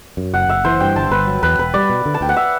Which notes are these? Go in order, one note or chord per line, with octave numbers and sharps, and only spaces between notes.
F#2
F#1 F#5
F#1 E5
E3 C5
G2 G5
G1 A5
G1 B4
F#3
E2 B4
E1 B4
G3 D5
B2
D3
A5
D2 G5
F#5
E5